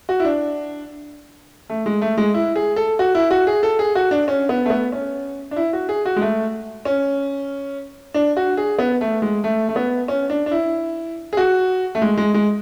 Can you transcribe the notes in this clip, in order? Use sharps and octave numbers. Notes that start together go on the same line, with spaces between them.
F#4
E4
D4
A3
G#3
A3
G#3
E4
G#4
A4
F#4
E4
F#4
G#4
A4
G#4
F#4
D4
C#4
B3
A3
B3
C#4
D4
E4
F#4
G#4
F#4
G#3
A3
C#4
D4
F#4
G#4
B3
A3
G#3
A3
A3
B3
C#4
D4
D4
E4
G#4
F#4
A3
G#3
G#3
G#3